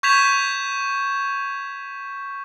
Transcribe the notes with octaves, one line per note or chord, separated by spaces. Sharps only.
C#6 G6 G#6 B6 E7 F7